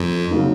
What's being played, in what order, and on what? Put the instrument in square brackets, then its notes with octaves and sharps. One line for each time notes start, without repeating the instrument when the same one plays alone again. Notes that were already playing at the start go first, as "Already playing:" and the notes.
Already playing: [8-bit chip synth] F2
[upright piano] C#3 F#3 A#3 D#4